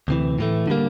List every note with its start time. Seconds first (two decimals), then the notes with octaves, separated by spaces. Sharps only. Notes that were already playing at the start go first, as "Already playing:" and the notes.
0.08 D2 C3 E3
0.38 A2 E3 A3
0.67 D3 G3 A#3